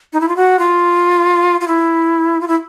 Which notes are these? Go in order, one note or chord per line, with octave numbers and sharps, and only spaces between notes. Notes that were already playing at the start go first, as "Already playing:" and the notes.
D#4
E4
F4
F#4
F4
F4
E4
F4
E4